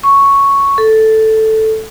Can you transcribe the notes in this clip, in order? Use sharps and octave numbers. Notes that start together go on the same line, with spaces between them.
C#6
A4